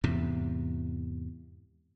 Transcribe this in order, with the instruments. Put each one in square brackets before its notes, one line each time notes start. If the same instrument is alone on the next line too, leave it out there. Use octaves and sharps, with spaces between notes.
[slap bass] E2 G#2 C3